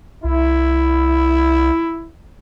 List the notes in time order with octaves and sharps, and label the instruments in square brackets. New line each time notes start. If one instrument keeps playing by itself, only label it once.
[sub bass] C2 [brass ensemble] E4